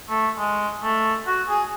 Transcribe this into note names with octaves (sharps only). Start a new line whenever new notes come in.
A3
G#3
A3
F#4
G#4